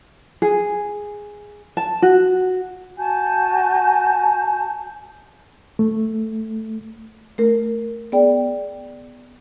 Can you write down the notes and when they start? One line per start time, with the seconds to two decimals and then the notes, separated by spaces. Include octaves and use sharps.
0.42 G#4
1.77 A5
2.02 F#4
2.97 F#4 G#5 A5 G6
5.79 A3
7.38 A3 A#4
8.12 B3 G#4 D5 G5